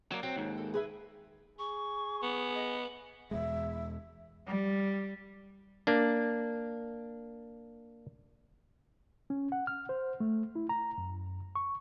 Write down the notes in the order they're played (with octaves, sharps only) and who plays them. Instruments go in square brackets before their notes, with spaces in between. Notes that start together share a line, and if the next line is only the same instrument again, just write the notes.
[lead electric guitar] F#3 A#3 [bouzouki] D4
[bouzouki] F#3 [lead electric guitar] C4
[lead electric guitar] D#2 G#2
[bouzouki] A4
G#4 B4 E5
[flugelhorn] G#4 [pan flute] C#6
[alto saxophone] B3
[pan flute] D#5
[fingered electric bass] E2 B2 G#3 [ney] E5
[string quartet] G3
[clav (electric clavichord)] A#3 D4
[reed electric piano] C#4
F#5
F6
C5
A3
E4
A#5
F#2
C#6